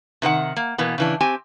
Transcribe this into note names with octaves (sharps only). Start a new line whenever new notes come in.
C3 D#3 B4 F#5
A#3
B2 E3 A#3 B3
C#3 E3 D4
C4 G4 G#5